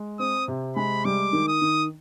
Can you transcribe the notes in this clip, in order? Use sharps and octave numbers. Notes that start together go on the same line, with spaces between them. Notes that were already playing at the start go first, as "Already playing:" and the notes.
Already playing: G#3
C4 D#6
C3
G#3 B5
G3 D6
D#3
D#6
D#3